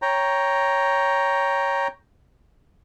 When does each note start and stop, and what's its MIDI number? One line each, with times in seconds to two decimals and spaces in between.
0.02 1.88 73
0.02 1.88 79
0.02 1.88 82